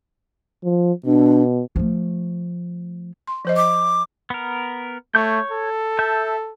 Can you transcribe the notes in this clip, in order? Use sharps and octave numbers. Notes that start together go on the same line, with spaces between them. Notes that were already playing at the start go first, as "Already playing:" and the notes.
F3
B2 D4
F3 A3
C6
F3 C5 D#5
D#5 D6
B3 A#4
A3 C#5 C#6 G6
A4
E5 A5 G6